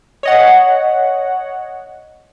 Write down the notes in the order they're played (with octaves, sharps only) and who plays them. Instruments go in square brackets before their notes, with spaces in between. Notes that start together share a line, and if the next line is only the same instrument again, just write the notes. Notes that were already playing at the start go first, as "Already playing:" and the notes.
[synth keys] C#5 D#5 F#5